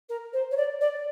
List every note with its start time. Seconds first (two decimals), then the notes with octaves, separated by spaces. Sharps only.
0.09 A#4
0.33 C5
0.51 C#5
0.57 D5
0.81 D5